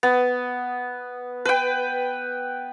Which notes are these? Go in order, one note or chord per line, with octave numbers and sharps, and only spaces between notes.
B3
B4 G5